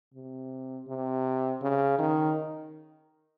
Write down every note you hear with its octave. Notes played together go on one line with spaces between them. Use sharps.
C3
C3
C#3
D#3